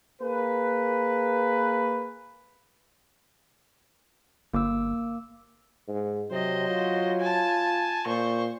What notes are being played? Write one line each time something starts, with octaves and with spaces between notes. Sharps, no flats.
A#3 G#4 B4
G1 A#3 D6 E6
G#2
C3 F#3 C5 D#5
F4
G#5 A5
A#2 C5 C#6